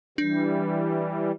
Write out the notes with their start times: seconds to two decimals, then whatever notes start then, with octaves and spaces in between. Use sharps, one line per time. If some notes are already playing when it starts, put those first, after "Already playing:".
0.18 E3 G3 D4